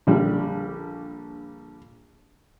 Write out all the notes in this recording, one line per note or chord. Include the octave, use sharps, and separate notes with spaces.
A#1 D3 G3